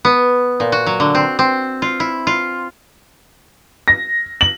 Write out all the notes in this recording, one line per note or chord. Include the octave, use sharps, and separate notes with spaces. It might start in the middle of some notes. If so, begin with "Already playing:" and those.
B3
A#2
F#4
F#3
D3
C4
C4
F4
E4
F4
A#6
F#7